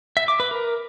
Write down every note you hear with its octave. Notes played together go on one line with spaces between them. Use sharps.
E5
D6
B4
A#4